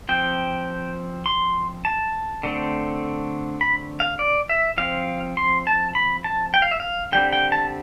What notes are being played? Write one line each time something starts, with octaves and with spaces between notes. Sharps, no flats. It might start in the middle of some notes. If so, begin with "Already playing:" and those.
F3 C4 G5
C6
A5
D3 A3 C4
B5
F5
D5
E5
F3 C4 F5
C6
A5
B5
A5
G5
F5
E5
F5
D3 G3 C4 G5
G5
A5